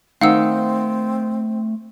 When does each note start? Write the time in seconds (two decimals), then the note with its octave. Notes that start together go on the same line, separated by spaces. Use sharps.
0.21 D#3 A3 C4 F5 F#5 E6